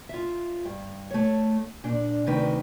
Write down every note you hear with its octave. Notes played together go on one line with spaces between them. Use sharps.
F4 E5
G2
A3 C#5
A#2 D4
D2 C3 D#3 B4